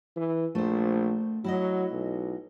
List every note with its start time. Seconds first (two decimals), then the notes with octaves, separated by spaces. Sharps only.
0.16 E3
0.55 A#1 A3 C5
1.44 F#3 E4 F#4 D#5
1.91 B1